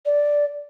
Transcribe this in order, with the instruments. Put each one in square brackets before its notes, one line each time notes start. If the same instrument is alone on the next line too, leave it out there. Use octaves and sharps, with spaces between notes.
[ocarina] D5